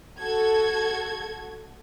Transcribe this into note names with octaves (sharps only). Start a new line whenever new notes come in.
F#4 A4 G#6